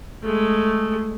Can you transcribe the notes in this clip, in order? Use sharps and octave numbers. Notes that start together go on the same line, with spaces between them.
G#3 A3